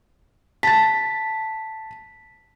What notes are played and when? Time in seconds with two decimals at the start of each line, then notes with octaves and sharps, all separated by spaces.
0.63 A5 A6 B6